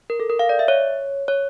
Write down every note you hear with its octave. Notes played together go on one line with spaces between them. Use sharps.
A#4
A4
A#4
F5
D5
E5
C#5
C#5